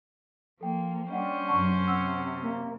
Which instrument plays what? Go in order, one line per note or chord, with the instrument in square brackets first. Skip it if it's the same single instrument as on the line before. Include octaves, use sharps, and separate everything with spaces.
[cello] F3 A#3 [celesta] A4 G5
[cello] G3 [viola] C#4 C5 [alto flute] D4 [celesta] D#5 F#5 G5
[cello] F#2 C3 [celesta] F#5 A5 C#6
[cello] C3 [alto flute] F#5 [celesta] E6
[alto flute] A#3